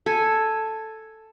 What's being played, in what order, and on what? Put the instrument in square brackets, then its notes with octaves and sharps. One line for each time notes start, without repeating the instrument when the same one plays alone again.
[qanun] A4 G#5